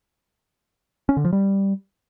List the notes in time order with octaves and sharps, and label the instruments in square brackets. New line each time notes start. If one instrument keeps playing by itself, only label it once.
[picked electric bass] C#4
D3
F3
G3